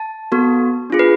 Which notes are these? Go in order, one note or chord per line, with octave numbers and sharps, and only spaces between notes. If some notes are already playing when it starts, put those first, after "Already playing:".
Already playing: A5
B3 F#4 A4
D4 F4 G#4
B4